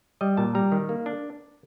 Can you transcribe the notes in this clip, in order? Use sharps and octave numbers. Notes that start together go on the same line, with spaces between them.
G3 D#5
A#2 A5
G3 A#5
D#3
A#3
D4